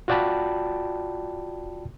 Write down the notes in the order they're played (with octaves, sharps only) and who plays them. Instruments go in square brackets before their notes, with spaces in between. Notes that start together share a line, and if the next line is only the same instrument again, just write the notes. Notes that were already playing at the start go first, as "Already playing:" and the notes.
[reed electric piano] F4 F#4 D5 G5 A5 B5